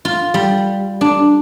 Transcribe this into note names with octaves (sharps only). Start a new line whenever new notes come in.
F4
G3
D4